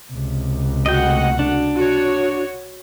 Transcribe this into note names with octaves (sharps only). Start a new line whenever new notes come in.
C#2 C3
A3 F#4 D#5 F#5 G5
D4
F#4 C#5